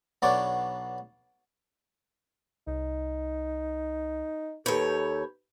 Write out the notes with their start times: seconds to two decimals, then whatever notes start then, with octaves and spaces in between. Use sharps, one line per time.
0.22 B1 B3 D4 C#5 D5 D6
2.67 C2 D#4
4.66 D#2 A4 B4 C#5 B5 G6